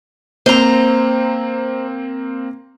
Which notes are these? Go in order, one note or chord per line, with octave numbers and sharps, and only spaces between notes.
A#3 C4 C5 A#5